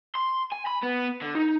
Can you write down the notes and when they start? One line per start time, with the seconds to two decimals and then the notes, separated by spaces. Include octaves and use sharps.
0.15 C6
0.52 G#5
0.66 B5
0.83 B3
1.22 D3
1.35 D#4